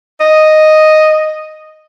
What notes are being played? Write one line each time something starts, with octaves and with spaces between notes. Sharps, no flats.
D#5